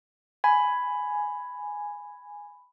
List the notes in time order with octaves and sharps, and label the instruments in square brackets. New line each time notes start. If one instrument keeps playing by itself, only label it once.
[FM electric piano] G#5 [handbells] B5